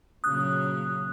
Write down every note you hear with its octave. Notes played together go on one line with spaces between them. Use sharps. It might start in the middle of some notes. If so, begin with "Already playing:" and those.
A#2 C#3 F#3 D#6 F#6